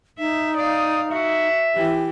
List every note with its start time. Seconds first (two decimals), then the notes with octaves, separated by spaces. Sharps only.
0.18 D#4 E5
0.57 D5 F5 D#6
1.12 F#4 E5
1.75 E3 G4